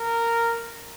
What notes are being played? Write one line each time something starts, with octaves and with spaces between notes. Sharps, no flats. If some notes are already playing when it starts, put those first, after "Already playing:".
Already playing: A#4